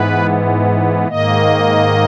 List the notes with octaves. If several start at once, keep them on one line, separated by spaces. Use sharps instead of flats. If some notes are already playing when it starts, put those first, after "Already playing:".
Already playing: G#2 E3 B3 B4
G#2 D#3 A#3 D#5